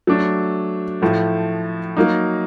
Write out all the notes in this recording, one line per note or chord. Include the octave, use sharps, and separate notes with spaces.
F#3 A3 D4
A2 F3 A3
F#3 A#3 D#4